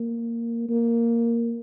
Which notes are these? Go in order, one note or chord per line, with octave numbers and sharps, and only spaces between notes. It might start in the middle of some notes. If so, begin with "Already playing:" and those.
Already playing: A#3
A#3